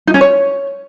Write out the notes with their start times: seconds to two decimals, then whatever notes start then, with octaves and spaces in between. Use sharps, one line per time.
0.07 D#4
0.14 C#4
0.21 C#5